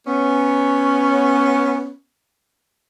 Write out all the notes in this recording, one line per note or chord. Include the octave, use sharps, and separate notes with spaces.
B3 C#4